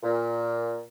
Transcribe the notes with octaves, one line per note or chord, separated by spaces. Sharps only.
A#2